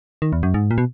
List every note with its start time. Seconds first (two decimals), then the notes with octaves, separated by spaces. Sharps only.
0.22 D#3
0.33 E2
0.43 F#2
0.54 G#2
0.71 A#2
0.78 B2